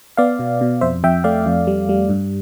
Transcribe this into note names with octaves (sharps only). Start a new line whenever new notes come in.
B3 D5 F5
B2
B2
F2 C5 E5
F2 E5 G5
A3 D5 F5
F2
G3
G3
G2